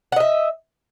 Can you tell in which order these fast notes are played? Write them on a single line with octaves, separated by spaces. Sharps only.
F#5 D#5 E5